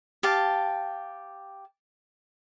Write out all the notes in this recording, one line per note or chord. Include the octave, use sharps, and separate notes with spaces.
G4 F5 A5